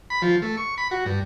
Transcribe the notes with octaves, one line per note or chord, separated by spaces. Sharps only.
B5
F3
A3
C#6
B5
F#4
G2